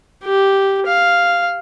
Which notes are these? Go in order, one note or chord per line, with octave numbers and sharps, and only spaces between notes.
G4
F5